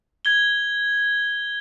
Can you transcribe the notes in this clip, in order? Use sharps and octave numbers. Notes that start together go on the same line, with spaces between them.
G#6 G7